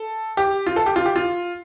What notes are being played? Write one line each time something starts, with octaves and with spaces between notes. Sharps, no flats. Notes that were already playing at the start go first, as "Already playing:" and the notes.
Already playing: A4
G4
F4
A4
G4
F4
G4
F4